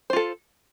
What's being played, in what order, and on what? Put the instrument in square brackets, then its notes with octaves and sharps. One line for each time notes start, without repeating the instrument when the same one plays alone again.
[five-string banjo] C5
F4
A4